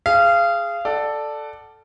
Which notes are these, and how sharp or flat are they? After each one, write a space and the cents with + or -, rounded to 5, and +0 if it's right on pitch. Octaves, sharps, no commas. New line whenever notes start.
G#4 +0 F5 -25
A4 +0 D5 +10 F#5 +15